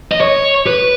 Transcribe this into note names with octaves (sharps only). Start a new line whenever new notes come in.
D#5
C#5
B4